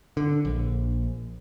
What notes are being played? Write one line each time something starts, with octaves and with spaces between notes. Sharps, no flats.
D3
A#1